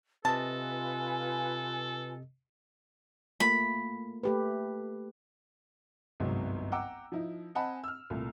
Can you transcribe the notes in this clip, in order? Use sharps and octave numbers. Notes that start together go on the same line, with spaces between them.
C3 F4 A4 B4 D#5 G#5 A5
A3 A#3 F4 B5
A3 G4 B4
G1 C2 G#2 C3 F#3
F#5 G5 A#5 D6 E6
F3 D#4 E4
C4 D#5 F#5 G#5 A5 B5
E6 F6
C2 A#2 A3